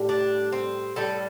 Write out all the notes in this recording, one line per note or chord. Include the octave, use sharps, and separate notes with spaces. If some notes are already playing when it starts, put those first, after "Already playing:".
Already playing: A2 G3
D4
C4
A2 G3 A4